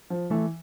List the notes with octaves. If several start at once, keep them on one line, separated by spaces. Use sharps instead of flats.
F3
E3 A3